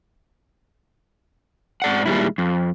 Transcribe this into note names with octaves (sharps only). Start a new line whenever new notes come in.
G#2 D5 F#5
A#2 D#3 G3 G#3 E4
F2